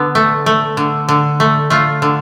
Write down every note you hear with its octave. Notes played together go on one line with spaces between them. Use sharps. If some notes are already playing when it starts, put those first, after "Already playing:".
Already playing: D3 B3
A3
A3
D3
D3
A3
A3 F4
D3